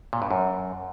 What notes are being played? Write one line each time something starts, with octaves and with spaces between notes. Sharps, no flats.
A#2
G2
F#2